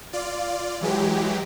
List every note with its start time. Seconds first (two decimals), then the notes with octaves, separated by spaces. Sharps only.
0.13 F4 D5
0.81 E3 F#3 G#3 G4